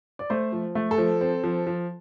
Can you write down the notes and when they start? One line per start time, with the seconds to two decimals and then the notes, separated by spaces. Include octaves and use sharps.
0.19 D5
0.30 A3 C5
0.52 F3
0.75 A3
0.91 A4
0.98 F3
1.21 C4
1.44 F3
1.67 F3